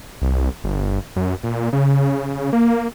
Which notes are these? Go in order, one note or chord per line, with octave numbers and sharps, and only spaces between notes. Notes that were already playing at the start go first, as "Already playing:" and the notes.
C2
G1
F#2
A#2
C#3
A#3